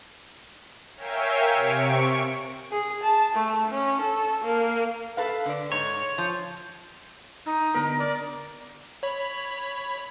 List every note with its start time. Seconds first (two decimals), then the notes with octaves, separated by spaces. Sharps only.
0.96 A#4 C#5 E5 F5 G5 G#5
1.51 C3 C#6 D7
2.72 G#4
3.03 A5
3.35 A3
3.70 C#4
4.01 A4
4.44 A#3
5.17 A4 B4 F5
5.46 D3 D5
5.72 G#2 C#5
6.18 F3
7.46 D#4
7.74 D3 B3 A#4 B4
7.99 D5
9.03 C#5 B5